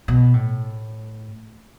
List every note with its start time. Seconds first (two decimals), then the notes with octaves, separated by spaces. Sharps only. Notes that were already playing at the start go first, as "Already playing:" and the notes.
0.08 B2
0.34 A2